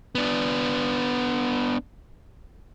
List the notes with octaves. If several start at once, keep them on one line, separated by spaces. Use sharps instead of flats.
B3 D4